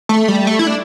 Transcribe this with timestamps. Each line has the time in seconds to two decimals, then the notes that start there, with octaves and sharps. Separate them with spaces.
0.09 A3
0.28 G3
0.47 A3
0.59 E4
0.67 D4